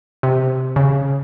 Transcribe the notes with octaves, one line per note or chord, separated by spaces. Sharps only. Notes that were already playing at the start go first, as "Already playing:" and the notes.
C3
C#3